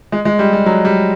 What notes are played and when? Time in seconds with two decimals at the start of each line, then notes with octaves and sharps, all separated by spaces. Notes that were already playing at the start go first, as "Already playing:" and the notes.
0.12 G#3
0.25 G#3
0.39 G3
0.53 G3
0.66 F#3
0.85 G3